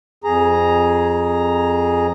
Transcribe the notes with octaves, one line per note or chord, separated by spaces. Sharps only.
F2 G#4 A#5